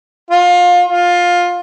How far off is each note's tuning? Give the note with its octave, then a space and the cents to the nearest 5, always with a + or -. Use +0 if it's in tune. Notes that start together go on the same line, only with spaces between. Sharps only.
F4 +25
F4 +15